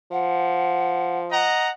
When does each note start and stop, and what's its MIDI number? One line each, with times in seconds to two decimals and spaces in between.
0.12 1.59 53
0.12 1.19 78
1.31 1.70 75
1.31 1.70 78
1.31 1.70 82